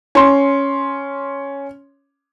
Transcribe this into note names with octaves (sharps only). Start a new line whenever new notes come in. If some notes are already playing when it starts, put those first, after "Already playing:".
C#4 C6